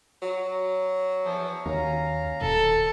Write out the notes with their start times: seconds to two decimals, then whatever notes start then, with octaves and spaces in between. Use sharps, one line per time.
0.22 F#3
1.24 E2 F3
1.66 D#2 C#4 F5 A#5
2.41 D#1 A4